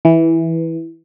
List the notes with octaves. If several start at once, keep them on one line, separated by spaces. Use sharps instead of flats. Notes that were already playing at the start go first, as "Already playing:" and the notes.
E3